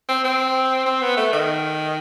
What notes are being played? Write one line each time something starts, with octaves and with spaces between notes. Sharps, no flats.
C4
C4
C4
B3
A3
D#3